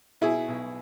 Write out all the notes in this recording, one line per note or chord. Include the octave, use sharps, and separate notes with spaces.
B2 E4 G#4
B1